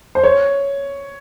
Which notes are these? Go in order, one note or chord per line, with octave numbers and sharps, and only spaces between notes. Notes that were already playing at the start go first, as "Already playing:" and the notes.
C5
C#5